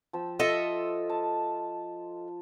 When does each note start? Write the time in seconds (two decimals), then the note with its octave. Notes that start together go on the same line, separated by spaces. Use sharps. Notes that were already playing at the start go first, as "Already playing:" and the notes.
0.13 F3 G5 E6
0.39 F4 A4 D#5 E5
1.10 A5